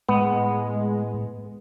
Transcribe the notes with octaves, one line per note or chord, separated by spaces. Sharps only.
A2 G#3 B3